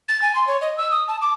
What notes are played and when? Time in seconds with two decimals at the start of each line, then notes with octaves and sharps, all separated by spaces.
0.09 A6
0.22 G#5
0.35 C6
0.47 C#5
0.61 D#5
0.78 E6
0.91 D#6
1.08 A5
1.22 D6